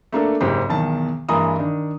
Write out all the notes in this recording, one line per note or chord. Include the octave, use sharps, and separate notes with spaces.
A3 A#3 D4 A4
F#1 G#2 G4 C5
B1 E2 D#3 A5
G2 E3 G#3 A#3 A#5 D#6
D#3 D4